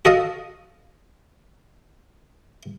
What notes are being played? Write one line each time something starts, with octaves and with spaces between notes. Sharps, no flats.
F#4 A4 D#5 F5